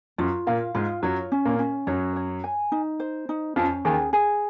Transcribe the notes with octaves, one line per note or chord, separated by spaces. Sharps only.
F#2 F#3 F4
A#2 A#3 F5
G#2 G#3 F4
F#2 F#3 C#5
C#4
A#2 A#3
C#4
F#2 F#3 C#5
C#5
G#5
D#4
C5
D#4
F2 F3 C#4
D#2 D#3 G#4
G#4